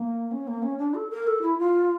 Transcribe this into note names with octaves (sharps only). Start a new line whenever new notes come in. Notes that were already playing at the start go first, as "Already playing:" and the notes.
Already playing: A#3
C#4
A#3
C#4
D4
A4
A#4
A4
E4
F4